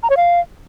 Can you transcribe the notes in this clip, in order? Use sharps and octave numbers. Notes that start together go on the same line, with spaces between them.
A#5
C#5
F5